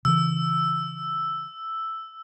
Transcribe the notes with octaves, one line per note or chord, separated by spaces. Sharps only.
C#3 E3 E6